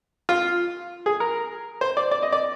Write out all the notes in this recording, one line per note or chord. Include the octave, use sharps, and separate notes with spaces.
F4
G#4
A#4
C5
D5
D5
D#5
D5